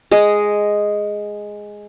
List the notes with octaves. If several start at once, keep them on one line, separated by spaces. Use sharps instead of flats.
G#3 D#5